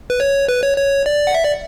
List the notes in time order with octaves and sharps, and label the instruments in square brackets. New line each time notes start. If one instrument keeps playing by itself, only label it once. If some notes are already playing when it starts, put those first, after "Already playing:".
[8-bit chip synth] B4
C#5
B4
C#5
C#5
D5
F#5
E5
D5